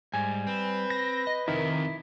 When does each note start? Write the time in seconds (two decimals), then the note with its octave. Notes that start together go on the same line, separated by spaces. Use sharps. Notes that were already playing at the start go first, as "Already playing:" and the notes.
0.14 G#2 G3 G#5
0.47 C4 B4
0.90 A#6
1.27 D#5
1.48 F2 C3 D#3 E4